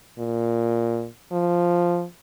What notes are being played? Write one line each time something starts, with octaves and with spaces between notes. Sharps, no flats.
A#2
F3